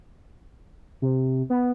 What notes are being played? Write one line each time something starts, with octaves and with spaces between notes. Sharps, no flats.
C3
B3